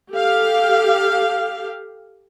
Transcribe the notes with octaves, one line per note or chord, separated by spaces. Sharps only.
G4 A4 F5